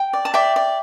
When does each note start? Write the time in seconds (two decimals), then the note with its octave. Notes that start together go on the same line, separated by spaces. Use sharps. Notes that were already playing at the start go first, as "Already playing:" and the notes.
Already playing: G5
0.13 D5
0.25 A5
0.34 D5 E5 G5
0.56 D5